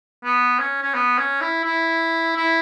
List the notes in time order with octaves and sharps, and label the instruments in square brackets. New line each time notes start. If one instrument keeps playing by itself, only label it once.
[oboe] B3
C#4
C#4
B3
C#4
E4
E4
E4